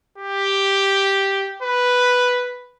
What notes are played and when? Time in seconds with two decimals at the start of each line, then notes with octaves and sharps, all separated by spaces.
0.18 G4
1.63 B4